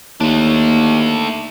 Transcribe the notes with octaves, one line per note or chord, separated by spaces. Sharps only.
D#2 A3 D4